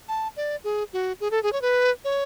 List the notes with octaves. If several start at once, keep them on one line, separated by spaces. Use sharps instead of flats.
A5
D5
G#4
F#4
G#4
A4
G#4
C#5
B4
C#5